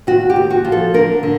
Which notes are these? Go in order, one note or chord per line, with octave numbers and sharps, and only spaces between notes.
D#2 F#4
G4
D#2
F#4
F3
A4
D3 A#4
D3